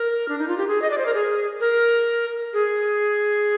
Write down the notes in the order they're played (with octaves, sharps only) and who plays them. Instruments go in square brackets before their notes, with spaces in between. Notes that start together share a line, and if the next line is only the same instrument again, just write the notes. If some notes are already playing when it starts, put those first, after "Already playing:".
Already playing: [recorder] A#4
D4
D#4
F4
G4
G#4
D#5
D5
C5
A#4
G#4
A#4
G#4